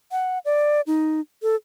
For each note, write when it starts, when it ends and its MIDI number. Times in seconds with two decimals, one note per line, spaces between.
0.12 0.39 78
0.45 0.81 74
0.87 1.20 63
1.43 1.55 69